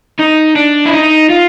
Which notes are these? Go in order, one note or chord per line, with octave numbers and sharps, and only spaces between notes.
D#4
D4
E4
D#4
F4